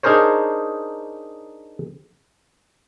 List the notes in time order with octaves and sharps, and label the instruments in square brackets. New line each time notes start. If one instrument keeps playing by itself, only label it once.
[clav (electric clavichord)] D4 D#4 G#4 A#4 C5 C#5